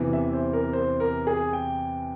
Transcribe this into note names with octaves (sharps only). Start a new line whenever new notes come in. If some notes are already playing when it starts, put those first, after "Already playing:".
Already playing: E2 C3 E3
E5
C5
A#4
C5
A#4
G#4
G5